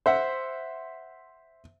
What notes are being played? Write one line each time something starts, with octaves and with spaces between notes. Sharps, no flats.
C5 E5 F#5